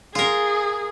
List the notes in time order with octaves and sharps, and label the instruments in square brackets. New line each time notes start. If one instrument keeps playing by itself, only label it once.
[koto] F4 A#4 [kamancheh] G#4